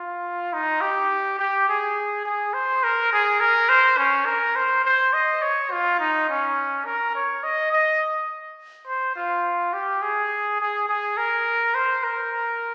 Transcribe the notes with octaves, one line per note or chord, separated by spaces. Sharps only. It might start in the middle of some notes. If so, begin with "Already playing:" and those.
Already playing: F4
D#4
G4
G4
G#4
G#4
C5
A#4
G#4
A#4
C5
C#4
A#4
C5
C5
D#5
C#5
F4
D#4
C#4
A#4
C#5
D#5
D#5
C5
F4
G4
G#4
G#4
G#4
A#4
C5
A#4